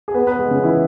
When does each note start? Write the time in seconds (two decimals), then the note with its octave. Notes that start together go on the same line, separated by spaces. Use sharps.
0.08 G#4
0.14 B3 B4
0.27 B3 B4
0.39 G#3 G#4
0.51 C#3 C#4
0.64 E3 E4